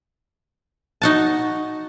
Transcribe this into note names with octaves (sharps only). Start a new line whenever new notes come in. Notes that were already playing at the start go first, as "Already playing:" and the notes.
D#4 F#4 A5